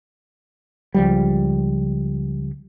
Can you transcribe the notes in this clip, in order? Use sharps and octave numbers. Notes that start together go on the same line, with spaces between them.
C#2 F3 G3